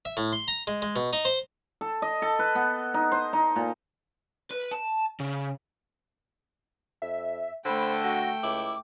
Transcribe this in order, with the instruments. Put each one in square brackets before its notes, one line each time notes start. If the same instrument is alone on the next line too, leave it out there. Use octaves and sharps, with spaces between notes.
[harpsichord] E5
A2
C6
A#5
G#3
G#3
B2
D#4
C5
[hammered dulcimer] A4
D#5
A4
B4
B3
D#4
C5
D#4
A#2
[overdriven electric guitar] B4
A5
C#3
[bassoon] F2 [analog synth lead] E5
[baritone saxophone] D3 [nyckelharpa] A3 G5 [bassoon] C5 [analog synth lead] B5
[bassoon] F#4 [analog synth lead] A#6
[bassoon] C#2 [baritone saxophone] E4 [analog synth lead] D6